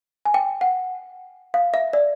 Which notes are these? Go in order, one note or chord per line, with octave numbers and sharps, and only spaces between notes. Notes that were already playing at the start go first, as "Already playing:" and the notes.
G#5
G5
F#5
F5
E5
D5